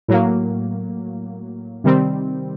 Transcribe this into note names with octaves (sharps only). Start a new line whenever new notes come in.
A2 F#3 A#3
C3 D#3 G3 C4